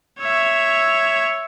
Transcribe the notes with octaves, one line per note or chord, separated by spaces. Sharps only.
C#5 E5